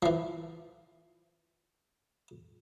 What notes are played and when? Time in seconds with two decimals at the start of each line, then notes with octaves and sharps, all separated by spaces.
0.03 E3 F3